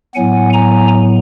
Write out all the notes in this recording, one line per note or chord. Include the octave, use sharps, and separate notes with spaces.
A2 F#3 B3 F#5 G#5
G#5 A#5